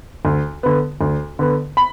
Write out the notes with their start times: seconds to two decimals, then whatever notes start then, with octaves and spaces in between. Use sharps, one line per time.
0.25 D2
0.63 D3 B3
1.01 D2
1.39 D3 B3
1.77 B5